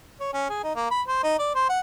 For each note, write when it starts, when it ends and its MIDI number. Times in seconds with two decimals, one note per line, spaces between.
0.20 0.29 73
0.33 0.46 61
0.50 0.61 68
0.64 0.75 63
0.76 0.86 58
0.91 1.01 83
1.08 1.19 72
1.23 1.36 63
1.39 1.54 74
1.55 1.68 72
1.69 1.80 78